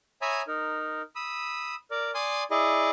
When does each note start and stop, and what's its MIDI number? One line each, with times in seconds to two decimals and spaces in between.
0.22 0.42 73
0.22 0.42 76
0.22 0.42 80
0.22 0.42 82
0.22 0.42 83
0.22 0.42 87
0.47 1.02 63
0.47 1.02 70
1.15 1.75 83
1.15 1.75 87
1.15 1.75 88
1.91 2.11 70
1.91 2.11 74
2.15 2.43 74
2.15 2.43 80
2.15 2.43 84
2.15 2.43 87
2.51 2.91 64
2.51 2.91 68
2.51 2.91 74
2.51 2.91 75